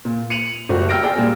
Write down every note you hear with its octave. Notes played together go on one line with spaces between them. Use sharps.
A#2
C#7 D#7 F7 F#7
F#1 G3 F#4
G5 E6 F6 A#6 D7
G#4 D5 G5
A#2 G3 A#3